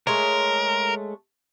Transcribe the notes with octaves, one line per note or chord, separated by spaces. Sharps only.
G#3 A3 A#4 C#5